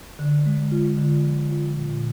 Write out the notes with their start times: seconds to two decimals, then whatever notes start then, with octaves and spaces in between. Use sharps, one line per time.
0.19 D3
0.46 G#3
0.72 F4
0.98 D3
1.24 F3
1.51 F4
1.76 A#2